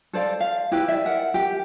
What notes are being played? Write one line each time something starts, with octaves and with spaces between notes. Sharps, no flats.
A4 C5 D5 F5
F5
E4 G4 B4
D5 E5
A#4 E5 F#5
G4